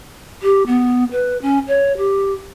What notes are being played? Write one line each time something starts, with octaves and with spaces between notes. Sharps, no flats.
G4
B3
B4
C#4
C#5
G4